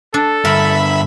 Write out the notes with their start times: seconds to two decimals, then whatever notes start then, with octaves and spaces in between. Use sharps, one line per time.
0.14 D4 A4
0.45 G2 D3 A#4 E5 B5